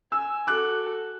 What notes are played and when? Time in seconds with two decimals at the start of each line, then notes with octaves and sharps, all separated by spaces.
0.12 G#5 E6
0.47 F#4 A4 D6 F#6